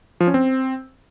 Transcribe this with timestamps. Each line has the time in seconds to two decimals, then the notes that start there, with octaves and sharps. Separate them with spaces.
0.20 F3
0.27 C#4
0.34 C4